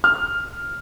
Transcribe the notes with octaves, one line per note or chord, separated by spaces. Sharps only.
F6